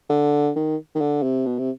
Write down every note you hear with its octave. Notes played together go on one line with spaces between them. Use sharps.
D3
D#3
D#3
D3
C3
B2
C3